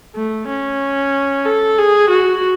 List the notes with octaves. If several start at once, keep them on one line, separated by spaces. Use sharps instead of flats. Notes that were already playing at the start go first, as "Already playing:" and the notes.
A3
C#4
A4
G#4
F#4